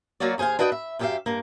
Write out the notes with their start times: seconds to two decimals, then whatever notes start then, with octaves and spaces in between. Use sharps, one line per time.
0.20 F#3 A#3 F4 F#4 D5
0.38 D#2 G#4 C5 F5 G#5
0.59 D4 F#4 B4 D#5 F#5 G5
0.72 E5
0.99 F#2 F4 G4 A4 E5 F5
1.26 G2 A#3